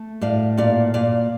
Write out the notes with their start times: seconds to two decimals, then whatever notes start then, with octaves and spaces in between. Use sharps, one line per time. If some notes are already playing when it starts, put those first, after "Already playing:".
Already playing: A3
0.21 A2 D5 F5
0.57 A#2 D5 F5
0.94 A#2 D5 F5